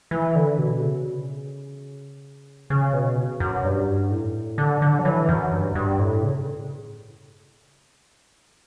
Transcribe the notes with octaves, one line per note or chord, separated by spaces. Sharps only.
E3
D3
B2
C#3
C#3
B2
F#2
G2
A2
D3
D3
F#3
E3
F#2
G2
G2
A2
C#3